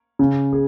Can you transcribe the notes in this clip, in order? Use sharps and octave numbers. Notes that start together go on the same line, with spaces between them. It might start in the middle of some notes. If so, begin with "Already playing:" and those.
C#3
G#4